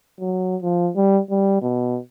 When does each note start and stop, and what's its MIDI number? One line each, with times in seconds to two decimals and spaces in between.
0.20 0.56 54
0.62 0.90 53
0.96 1.20 55
1.31 1.59 55
1.62 1.99 47